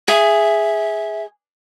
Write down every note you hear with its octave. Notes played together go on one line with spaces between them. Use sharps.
G#4 E5